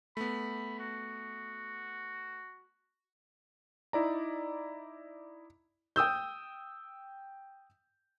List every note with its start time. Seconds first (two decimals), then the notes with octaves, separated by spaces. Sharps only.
0.17 A3 B3 B5
0.79 F#4
3.93 D#4 E4 D5 A#5
5.96 G5 D#6 E6 G6